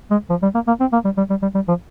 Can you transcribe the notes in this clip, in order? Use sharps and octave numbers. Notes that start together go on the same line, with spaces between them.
G#3
F3
G3
A#3
A#3
C4
A#3
G3
G3
G3
G3
G3
F3